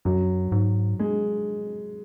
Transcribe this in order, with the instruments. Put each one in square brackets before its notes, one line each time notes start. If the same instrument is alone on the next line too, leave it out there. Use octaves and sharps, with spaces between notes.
[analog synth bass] F#2 [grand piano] F#3
[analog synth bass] G#2
[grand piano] G#3